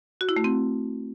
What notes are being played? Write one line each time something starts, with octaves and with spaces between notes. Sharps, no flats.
F#4
E4
A3
C4